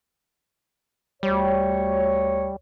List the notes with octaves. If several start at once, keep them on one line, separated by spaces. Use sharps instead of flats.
D2 G3 C#5